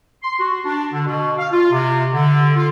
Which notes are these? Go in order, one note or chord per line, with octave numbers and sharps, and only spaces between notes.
C6
F#4
D4
D3
B2
F5
F4
C3
D3
F4